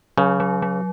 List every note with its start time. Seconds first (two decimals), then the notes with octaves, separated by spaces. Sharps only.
0.17 C#3 F#3
0.40 F#3
0.62 F#3